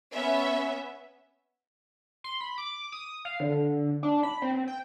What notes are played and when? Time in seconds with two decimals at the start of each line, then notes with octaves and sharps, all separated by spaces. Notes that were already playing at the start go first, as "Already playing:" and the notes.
0.12 B3 C#4 E5
2.24 C6
2.41 B5
2.58 D6
2.92 D#6
3.25 F5
3.40 D3
4.03 D4
4.23 B5
4.42 C4
4.54 C4
4.68 G5